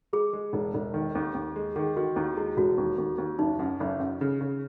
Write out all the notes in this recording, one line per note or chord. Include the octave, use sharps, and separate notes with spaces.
G#3 G#4
G#3
E1
E1
D#3
D#2
D#2
G#3
D#3 G#4
D#3 F#4
D#2 E4
G#3 E4
E1 F#4
D#2
D#2
D#2
F#1 D#4
F#2
F#1
F#2
C#3
C#3